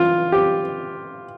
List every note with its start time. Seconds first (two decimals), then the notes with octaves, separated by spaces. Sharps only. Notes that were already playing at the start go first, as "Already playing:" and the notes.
Already playing: E3 F4
0.32 G4